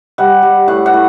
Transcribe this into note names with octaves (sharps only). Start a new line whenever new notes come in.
G3 F#5
G3
A2 F#5
F#5
A2